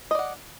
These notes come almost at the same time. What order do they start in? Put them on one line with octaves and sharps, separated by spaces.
D#5 D5 F#5